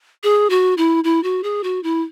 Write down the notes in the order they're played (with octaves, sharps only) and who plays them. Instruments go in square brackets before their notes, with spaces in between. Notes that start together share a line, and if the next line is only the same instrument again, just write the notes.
[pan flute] G#4
F#4
E4
E4
F#4
G#4
F#4
E4